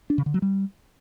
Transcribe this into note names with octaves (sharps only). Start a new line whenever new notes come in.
D4
C#3
D3
F#3
G3